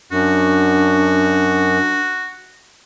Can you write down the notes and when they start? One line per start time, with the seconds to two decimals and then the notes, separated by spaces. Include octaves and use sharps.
0.12 F#2 D4 F#4